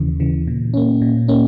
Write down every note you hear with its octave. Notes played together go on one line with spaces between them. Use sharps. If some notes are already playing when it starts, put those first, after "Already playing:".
Already playing: D#2 C#3 E3
C#3 E3
A#2
A#3 C#4
A#2
A#3 C#4